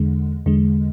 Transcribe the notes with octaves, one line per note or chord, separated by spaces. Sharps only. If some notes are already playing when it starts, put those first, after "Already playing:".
Already playing: E2 D3 G#3
E2 D3 G#3